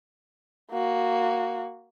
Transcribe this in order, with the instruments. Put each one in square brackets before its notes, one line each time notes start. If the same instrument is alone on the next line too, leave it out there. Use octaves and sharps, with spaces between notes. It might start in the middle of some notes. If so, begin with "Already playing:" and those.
[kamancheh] A#3 F#4